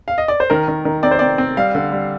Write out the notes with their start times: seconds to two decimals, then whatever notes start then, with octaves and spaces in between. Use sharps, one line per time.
0.08 F5
0.18 D#5
0.28 D5
0.40 C5
0.50 D#3 A#4
0.68 D#3
0.85 D#3
1.03 C4 D5
1.11 C5
1.19 C4 D5
1.38 C4
1.57 G3 F5
1.75 D3
1.92 G3